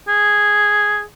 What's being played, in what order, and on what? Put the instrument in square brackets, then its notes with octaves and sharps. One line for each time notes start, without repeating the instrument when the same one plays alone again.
[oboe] G#4